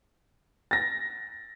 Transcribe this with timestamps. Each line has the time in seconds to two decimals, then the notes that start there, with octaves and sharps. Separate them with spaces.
0.71 A6 A#6